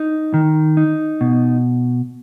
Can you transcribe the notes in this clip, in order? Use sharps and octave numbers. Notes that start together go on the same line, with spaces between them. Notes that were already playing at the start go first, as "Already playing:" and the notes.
Already playing: D#4
D#3
D#4
B2